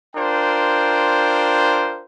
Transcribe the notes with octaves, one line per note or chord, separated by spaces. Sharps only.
D4 F4 A#4 C5 G5